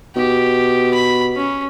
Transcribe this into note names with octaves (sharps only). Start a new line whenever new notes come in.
B2 G4
B5
C#4